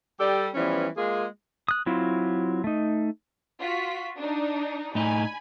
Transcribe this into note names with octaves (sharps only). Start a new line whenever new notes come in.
G3 G4 A4 D5
E3 F3 G3 B3 C#4
G#3 A#3 F4 G#4
D#6 F#6
F#3 C4 E4 F4
A3 D#4
F4 F#4 B6
D4 D#4
A2 D#4 G#5 B5